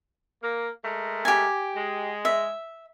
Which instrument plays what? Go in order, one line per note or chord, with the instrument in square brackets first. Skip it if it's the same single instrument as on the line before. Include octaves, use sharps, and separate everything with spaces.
[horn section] A#3
G#3 A3 A#4
[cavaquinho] G4 G#5
[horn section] G#3
[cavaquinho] E5